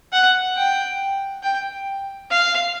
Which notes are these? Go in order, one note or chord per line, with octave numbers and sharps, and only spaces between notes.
F#5
G5
G5
F5